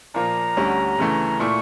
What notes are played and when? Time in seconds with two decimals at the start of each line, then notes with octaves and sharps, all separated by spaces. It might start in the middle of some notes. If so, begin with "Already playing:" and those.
0.14 A#2 F3 A#3 A#5
0.57 D2 D3 G3 C#4
0.98 D2 C#3 E3 A3
1.40 A#2 A3 E4 C#6